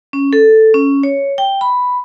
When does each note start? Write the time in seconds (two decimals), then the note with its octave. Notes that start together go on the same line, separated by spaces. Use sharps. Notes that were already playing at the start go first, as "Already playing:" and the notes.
0.13 C#4
0.33 A4
0.74 C#4
1.03 C#5
1.38 G5
1.61 B5